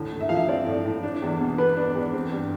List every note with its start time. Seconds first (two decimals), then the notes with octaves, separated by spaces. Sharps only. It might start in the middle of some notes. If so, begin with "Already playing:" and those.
Already playing: D2 A2
0.12 A2
0.20 E5
0.29 F3 F5
0.36 E5
0.48 C4 D5
0.67 A2
0.85 A2
1.03 D4
1.22 E2
1.41 B2
1.58 B3 B4
1.77 D4
1.95 E2
2.13 C4
2.31 G2